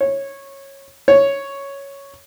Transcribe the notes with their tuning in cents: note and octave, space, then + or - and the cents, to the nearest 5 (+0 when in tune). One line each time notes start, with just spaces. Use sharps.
C#5 -15
C#5 +0